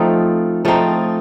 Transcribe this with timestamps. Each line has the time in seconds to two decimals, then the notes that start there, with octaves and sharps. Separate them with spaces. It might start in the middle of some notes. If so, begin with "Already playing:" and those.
Already playing: F3 A3 C4 D#4
0.65 F3 A3 C4 D#4